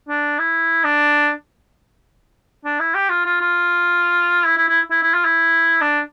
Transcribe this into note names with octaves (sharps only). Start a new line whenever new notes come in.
D4
E4
D4
D4
E4
G4
F4
F4
F4
E4
E4
E4
E4
E4
F4
E4
D4